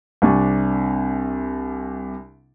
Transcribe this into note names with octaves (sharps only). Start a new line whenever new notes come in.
C2 C3 D4 G#5 C#6